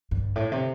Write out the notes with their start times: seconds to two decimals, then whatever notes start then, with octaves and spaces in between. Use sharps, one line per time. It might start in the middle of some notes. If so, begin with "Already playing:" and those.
0.11 G2
0.36 A2
0.52 C3